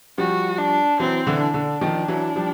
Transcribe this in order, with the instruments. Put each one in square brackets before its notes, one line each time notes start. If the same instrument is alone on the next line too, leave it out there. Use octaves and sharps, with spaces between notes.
[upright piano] F3 G3 [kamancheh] F#4
[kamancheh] D4
[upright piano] E3 F#3 [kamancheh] C4
[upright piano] D3 E3
[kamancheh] D4
[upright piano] D3
D#3 F3
E3 F#3
F3 G3